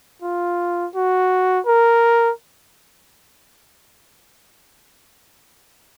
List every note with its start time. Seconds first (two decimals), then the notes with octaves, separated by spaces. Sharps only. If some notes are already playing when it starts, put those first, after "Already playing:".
0.22 F4
0.95 F#4
1.66 A#4